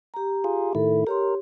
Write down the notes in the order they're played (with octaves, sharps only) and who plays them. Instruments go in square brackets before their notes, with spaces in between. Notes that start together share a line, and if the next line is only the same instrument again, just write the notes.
[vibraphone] G4 A#5
[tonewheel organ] F4 G#4
[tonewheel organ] A2 D#3 E4 [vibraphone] A4
[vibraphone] G4 C#5 C6 [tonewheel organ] A#4